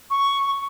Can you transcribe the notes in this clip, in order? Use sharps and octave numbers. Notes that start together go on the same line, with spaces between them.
C#6